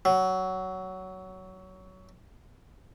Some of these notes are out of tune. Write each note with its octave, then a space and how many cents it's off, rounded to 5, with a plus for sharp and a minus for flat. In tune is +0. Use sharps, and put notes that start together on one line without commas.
F#3 +15